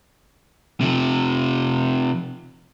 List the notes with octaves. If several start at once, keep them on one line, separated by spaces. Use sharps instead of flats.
C3 F3